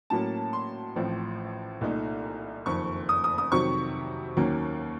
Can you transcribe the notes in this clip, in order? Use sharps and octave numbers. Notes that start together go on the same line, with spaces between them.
A2 F#3 A#3 C#4 A5
C6
A1 A2 F3 C4
C2 A#2 A3 D#4
F#1 F2 D#3 C#6
D#6
D#6
D#6
F2 C3 D#3 F#3 C#6
D#2 D#3 F#3 A#3 C#4